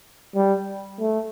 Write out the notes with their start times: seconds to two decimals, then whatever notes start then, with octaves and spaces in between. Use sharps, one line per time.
0.35 G3
1.00 A3